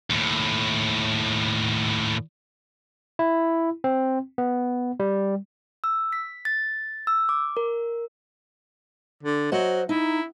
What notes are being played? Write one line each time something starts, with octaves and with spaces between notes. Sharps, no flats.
D#2 A2
E4
C4
B3
G3
E6
B6
A6
E6
D6
A#4
D3
F#3 C5 D#5 F#5
D#4 E4